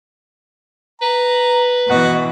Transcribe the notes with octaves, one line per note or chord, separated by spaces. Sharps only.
B4 A#5
B2 E3 B3 F#4 D#5 F#5